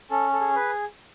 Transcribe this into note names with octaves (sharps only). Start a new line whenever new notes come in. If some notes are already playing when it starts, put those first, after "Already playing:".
C#4 A4
A4
G#4
B4